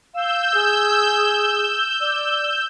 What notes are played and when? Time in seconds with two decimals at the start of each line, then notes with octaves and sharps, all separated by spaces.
0.14 F5 E6 G6
0.54 G#4
2.01 D5